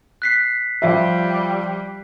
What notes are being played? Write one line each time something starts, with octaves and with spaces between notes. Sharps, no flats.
F#6 B6 C7
F3 G3 E5